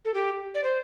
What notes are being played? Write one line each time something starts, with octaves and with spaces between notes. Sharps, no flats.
A4
G4
D5
C5